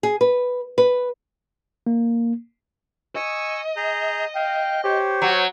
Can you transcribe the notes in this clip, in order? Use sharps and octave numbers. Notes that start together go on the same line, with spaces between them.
G#4
B4
B4
A#3
D#5 G#5 C#6 E6
G#4 A#5 G6
F5 G5
G4 C5 C#5
F#3